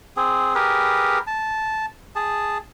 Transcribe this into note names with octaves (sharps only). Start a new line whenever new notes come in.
C4 G#4
G4 G#4 A#4 B4
A5
G#4 A5